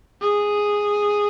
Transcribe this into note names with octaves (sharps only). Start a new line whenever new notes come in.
G#4